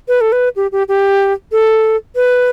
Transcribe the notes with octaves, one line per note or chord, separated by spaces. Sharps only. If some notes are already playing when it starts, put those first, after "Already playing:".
B4
A4
B4
G4
G4
G4
A4
B4